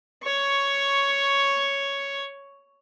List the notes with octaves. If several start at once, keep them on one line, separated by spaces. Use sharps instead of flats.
C#5 C#6